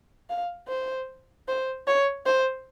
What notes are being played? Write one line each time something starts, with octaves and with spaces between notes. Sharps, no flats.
F5
C5
C5
C#5
C5